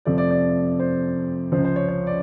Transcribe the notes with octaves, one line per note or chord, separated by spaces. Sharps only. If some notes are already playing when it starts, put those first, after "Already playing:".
F2 C3 F3 A3 D5
D5
D5
C5
C#2 C#3 F3 C5
C5
C#5
C#5
D5